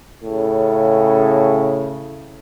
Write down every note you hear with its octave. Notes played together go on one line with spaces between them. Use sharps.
A2 C#3